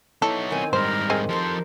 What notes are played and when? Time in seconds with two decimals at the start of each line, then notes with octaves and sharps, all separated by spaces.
0.22 B3 D#4 E4 A4 C#5
0.50 D#3 C4 G#5
0.73 G#2 G3 A#4 C5
1.10 C4 G#4 D#5
1.29 F3 G4 A4 A#4 C5 C6